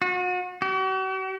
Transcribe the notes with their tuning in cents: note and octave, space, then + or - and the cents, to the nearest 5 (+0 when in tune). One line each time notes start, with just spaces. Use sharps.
F#4 -35
F#4 +45